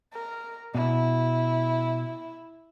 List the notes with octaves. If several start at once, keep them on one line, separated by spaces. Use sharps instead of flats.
A#4
B2 E4